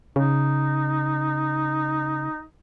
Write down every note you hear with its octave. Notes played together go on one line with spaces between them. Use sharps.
C#3 D#4